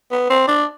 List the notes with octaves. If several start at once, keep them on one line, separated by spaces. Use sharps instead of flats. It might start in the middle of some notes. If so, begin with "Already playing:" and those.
B3
C4
D4